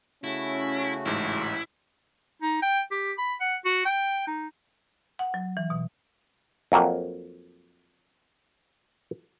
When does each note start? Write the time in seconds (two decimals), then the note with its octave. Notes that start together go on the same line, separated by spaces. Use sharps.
0.24 C#3 A3 C#4 E4 F#4
1.05 A1 G#2 E4
2.42 D#4
2.62 G5
2.91 G4
3.18 B5
3.40 F#5
3.65 F#4
3.85 G5
4.27 D#4
5.19 F#5
5.34 F#3
5.57 E3
5.70 B2
6.72 F2 F#3 A#3